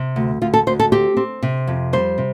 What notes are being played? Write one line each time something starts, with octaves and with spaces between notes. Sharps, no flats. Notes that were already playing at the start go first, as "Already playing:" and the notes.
Already playing: C3
D2
D2 F4
A4
D2 C5
A4
C4 G4
C4
C3
F2
G3 C5
C3